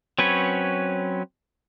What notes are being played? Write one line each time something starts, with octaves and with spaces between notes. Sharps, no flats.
F#3 C4 C#4 B4 C#5